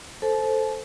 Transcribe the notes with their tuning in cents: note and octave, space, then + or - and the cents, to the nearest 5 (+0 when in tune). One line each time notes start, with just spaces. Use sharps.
A4 +0 C5 +0 A5 -40